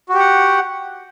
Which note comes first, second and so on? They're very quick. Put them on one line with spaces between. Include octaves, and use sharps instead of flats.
F#4 G4 F#5